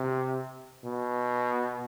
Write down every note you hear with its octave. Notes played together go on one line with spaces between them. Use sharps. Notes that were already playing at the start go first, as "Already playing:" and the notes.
Already playing: C3
B2